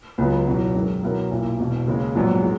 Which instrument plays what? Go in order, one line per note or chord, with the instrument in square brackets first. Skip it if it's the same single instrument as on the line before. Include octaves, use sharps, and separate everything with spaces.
[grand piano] C#2 C#3 F#3 B3
E2 B2 F#3
F#2 D#3 G#3
B2 F#3 B3 E4 A#4
B1 A#2 A#3 E4
E1 E2 B2
D#2 C#3 G#3
A#1 G#2 F#3 B3
G#3